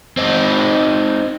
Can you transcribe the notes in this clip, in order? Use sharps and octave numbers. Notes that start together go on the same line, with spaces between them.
C4 D#4